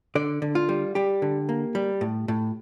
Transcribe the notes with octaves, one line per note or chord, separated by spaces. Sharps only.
D3 D5
D3
F4
G3
G3 G4
D3
A#3
G3
A2
A2